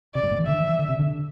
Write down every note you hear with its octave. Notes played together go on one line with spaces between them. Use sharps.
C3 D5
G2
A2
E3
D3 E5
E3
E3
D3
C3
D3